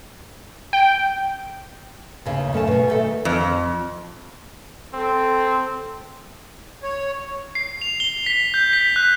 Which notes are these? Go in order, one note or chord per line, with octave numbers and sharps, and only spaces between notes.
G5
D#2 C#3
F#2 A3 C#4 A5
B2 C#4
D#3 A3 A4
F2
C4 A4
C#5
C7
F7
G7
B6
G6
B6
F#6